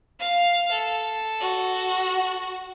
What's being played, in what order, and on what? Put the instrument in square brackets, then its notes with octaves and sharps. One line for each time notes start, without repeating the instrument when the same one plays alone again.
[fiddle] F5
A4
[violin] F#4